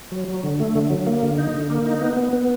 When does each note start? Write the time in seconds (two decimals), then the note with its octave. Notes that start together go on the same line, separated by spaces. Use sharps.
0.12 F#3
0.28 F#3
0.43 D3
0.60 A3
0.75 D3
0.90 F#3
1.07 A#3
1.23 D3
1.38 D#4
1.54 D3
1.70 A#3
1.86 D#4
2.02 B3
2.17 B3
2.33 B3